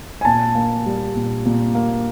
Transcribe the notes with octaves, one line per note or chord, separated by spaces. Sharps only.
G#5
A#2 A5
A#3
G3
A#2
A#2
A#3